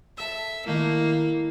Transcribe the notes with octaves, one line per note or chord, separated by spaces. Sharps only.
A4 E5 E6
D#3 A3 A#3 E4